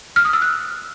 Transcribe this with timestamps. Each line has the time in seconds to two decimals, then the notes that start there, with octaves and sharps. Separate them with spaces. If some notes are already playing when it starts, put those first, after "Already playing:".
0.16 F6
0.25 D#6
0.33 E6
0.42 F#6